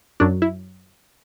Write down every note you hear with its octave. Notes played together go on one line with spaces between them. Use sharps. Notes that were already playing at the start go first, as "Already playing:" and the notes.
F#2 F#3 D4
E4